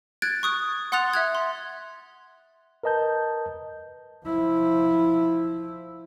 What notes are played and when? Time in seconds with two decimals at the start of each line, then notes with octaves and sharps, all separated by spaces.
0.22 F#6 G#6 A6 D7
0.43 C#6 D#6 F#6
0.92 F#5 C6 D#6 F#6 A6 F7
1.14 E5 F#6 G#6
1.35 C6
2.83 A#4 B4 D#5 A5 G6
4.26 F3 E4